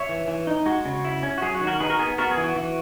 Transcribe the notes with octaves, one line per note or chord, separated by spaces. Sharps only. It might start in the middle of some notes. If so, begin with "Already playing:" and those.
Already playing: C#5 E5
E3
E3
D#4
G#3 F#4
C#3
E4
C#4
F#4
F#3 G#4
F#4
D#3
F#4 A#4
D#4 G#4 B4
F#4 A#4
B3 G#4
B3 F#4 A#4
G#4
E3
F#4
E3